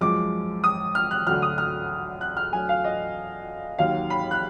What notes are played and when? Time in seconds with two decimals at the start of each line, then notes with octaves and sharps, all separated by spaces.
0.01 F#2 F3 G#3 D6
0.64 D#6
0.95 F6
1.11 F#6
1.27 D2 D3 F#3 F6
1.42 D#6
1.58 F6
2.21 F#6
2.37 F6
2.53 D2 D3 F#3 G#5
2.69 F5
2.84 D#5
3.79 D#2 D#3 F#3 F5
4.10 B5
4.31 F#6